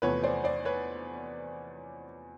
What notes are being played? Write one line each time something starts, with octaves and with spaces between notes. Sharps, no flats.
E2 C3 F3 A3 B4 C#5
C5 D5
C5 D5
B4 C#5